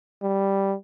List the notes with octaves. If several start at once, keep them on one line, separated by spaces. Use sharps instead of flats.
G3